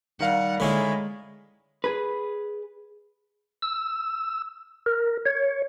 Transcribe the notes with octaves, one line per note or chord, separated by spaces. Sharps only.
D#3 G3 A#4 F5 F#5
D3 G#3 C#4 E4 D5 G#5 B5
G#4 B4
E6
A#4
C#5